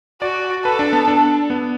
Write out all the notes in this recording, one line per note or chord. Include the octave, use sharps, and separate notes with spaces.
F#4 D5
A4 B4
D4
B3
D4
B3